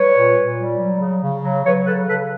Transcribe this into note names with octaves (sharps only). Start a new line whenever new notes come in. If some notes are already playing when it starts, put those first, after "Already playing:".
Already playing: G3 B4 C#5
A#2
A#2
G3
F#3
C#3
C#3
F#3
F#3 B4 C#5
C#3 A4 B4
C#3 A4 B4